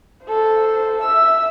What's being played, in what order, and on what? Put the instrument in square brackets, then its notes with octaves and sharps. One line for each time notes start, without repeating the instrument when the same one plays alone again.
[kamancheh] A4 C5
E5 E6